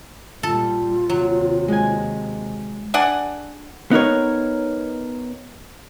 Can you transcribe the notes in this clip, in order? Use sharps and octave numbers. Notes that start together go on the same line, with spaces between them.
A#2 G3 F4 A4
D#2 C3 F#3
G#3 G#5
D4 G#4 D5 F#5
B3 D#4 A#4 C#5